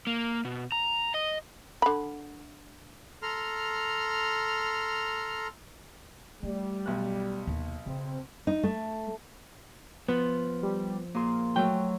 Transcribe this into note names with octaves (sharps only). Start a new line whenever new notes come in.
A#3
B2
A#5
D#5
D3 B5
A4 A#5 C6 F6
G3 A3
B1 F#6
D#2 C3
C#3 C4
D#4
A3
F3 B3
G3
A#2 A#3 G#4 C6
F#3 A3 G5